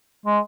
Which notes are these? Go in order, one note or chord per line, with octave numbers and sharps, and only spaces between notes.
G#3